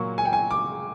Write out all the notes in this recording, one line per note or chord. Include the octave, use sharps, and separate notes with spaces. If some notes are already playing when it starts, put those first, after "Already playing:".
Already playing: A#2 F#3 A#3 C#6
G#5
G5
G#5
D6